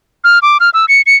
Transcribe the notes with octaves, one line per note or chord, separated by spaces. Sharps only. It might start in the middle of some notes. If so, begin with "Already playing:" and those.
F6
D6
F6
E6
C#7
C#7